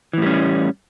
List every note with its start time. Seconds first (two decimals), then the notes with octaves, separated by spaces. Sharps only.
0.13 E3
0.18 A2
0.22 G3
0.26 C#4